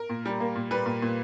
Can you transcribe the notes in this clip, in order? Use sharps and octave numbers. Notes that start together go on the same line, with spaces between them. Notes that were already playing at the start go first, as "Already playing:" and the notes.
Already playing: A#4
A#2
G3
A#3
A#2
G3 B4
A#2
A#2